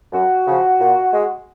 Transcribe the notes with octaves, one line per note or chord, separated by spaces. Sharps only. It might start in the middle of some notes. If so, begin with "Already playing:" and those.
F#2 F#4
C#3 F3
A#2
G#3